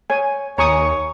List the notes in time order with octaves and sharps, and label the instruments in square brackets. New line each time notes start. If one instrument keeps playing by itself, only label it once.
[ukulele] C#5 [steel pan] G#5
[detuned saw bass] D#2 [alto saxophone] C#5 [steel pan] G#5 C#6 D#6 [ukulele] A#5